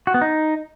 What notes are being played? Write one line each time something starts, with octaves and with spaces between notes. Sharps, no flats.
F#4
B3
D#4